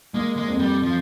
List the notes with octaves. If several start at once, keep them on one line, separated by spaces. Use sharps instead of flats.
G#3 A#3
G#3
F2
G3
F3